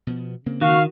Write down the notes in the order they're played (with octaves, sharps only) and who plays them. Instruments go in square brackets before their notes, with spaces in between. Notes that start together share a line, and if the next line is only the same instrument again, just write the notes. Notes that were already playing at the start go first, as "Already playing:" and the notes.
[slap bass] B2 F3 B3
C#3 A#3 C4
[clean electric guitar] D#3 [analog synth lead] F#4 [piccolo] F5